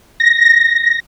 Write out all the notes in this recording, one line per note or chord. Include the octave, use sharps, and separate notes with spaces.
A#6